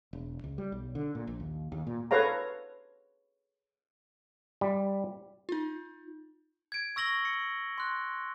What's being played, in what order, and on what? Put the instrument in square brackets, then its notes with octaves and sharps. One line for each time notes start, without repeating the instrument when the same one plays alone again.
[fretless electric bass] E1
C#2
G3
B1
D3
A#2
A#1
D#2
D#2
A#2
[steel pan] A4 B4 C#5 F5 A#5
[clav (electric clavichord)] G3
[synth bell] D#4 F4
[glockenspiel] G#6 D7
C#6 E6 A#6 F#7 G7
C#7
C6 F#6